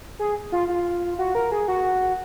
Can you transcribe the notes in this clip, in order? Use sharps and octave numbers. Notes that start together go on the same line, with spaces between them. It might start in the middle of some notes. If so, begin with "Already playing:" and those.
G#4
F4
F4
F#4
A#4
G#4
F#4